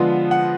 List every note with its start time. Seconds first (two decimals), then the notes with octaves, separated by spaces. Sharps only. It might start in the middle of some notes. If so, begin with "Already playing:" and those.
Already playing: D3 F3 G#3 B3 F4
0.31 F#5